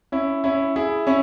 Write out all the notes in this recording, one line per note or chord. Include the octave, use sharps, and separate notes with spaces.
C#4 E4
C#4 E4
E4 G#4
C#4 E4